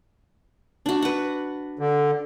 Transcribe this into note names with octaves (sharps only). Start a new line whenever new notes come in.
D4 F#4
B4 F#5
D3